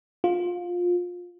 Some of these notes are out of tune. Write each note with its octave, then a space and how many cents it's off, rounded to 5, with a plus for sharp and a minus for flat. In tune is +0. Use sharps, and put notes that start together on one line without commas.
F4 +20